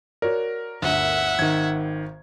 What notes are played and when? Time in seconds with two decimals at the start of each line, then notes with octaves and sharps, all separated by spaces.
0.22 F#4 A#4 C#5 D5
0.82 G1 D2 E5 F#5
1.39 G#1 D#3 G#6